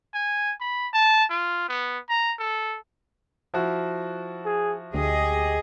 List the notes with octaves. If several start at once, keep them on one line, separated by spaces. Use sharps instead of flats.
G#5
B5
A5
F4
B3
A#5
A4
F3 E4 F#4
G#4
D2 G4 G#4 D#5